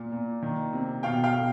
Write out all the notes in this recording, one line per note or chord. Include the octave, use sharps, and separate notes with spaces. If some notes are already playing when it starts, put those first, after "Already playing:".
Already playing: A#2
A#2
D#3
C3
B2 F5 G5
F5 G5
B2